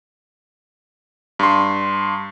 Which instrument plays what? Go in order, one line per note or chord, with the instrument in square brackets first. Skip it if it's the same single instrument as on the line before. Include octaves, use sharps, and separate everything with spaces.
[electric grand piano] G2 C6